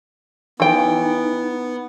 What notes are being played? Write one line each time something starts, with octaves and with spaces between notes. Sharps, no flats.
E3 B3 D#4 G5